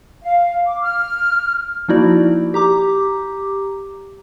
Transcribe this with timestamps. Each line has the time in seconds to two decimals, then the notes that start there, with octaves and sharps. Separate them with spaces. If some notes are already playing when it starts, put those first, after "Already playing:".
0.23 F5
0.66 D6
0.82 F6
1.88 F3 A#3 D#4 E4 F#4 D5
2.54 G4 A#5 D6